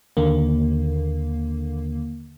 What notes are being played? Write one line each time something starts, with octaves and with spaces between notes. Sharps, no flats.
D#2 D3 A#3